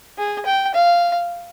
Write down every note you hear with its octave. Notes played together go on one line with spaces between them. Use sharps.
G#4
G5
F5